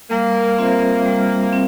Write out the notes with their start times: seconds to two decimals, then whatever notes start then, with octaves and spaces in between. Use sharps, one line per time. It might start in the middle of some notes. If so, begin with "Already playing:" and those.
0.10 G3 A#3
0.58 C4 F4 C5 E5
1.06 G3
1.53 C4